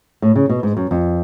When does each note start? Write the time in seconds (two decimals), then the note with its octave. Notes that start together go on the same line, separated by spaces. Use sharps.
0.22 A2
0.36 C#3
0.49 B2
0.63 G#2
0.77 F#2
0.91 F2